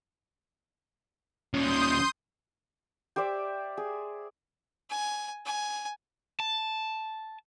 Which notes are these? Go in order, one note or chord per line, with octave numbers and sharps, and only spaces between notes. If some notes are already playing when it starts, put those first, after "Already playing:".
D#2 C#4 C6 D#6 G6
G4 C5 D5 E5
G#4
G#5
G#5
A5